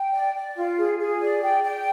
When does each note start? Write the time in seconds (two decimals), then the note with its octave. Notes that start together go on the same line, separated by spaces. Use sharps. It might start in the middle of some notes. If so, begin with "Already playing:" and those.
Already playing: G5
0.13 D5
0.35 D5
0.56 F4
0.78 G#4
0.99 G#4
1.20 D5
1.42 G5
1.64 G5